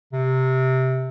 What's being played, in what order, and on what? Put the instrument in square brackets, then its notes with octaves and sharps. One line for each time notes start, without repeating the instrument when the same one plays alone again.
[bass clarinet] C3